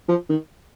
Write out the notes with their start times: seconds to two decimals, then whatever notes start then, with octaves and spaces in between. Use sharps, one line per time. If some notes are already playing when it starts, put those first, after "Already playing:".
0.08 F3
0.30 D#3